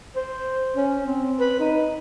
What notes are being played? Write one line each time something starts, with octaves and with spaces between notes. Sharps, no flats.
C5
C#4
C4
B4
D#4